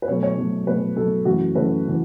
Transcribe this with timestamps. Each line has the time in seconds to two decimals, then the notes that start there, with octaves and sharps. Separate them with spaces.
0.02 B4
0.08 B2 F#3 A3 C#5
0.23 C#5
0.37 B2 F#3 A3
0.67 B2 F#3 A3 B4
0.96 B2 F#3 A3 A4
1.25 F#2 E3 A3 F#4
1.55 F#2 E3 A3 B4
1.88 E3